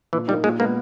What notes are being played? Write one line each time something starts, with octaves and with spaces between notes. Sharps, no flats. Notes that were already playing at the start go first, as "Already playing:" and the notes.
A#2 E3
G3 A#3 D#4
A#2 G#3
G#3 A#3 B3